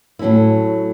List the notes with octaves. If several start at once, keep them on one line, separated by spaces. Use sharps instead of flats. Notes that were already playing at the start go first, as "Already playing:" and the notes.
A2 F#3 C#4 E4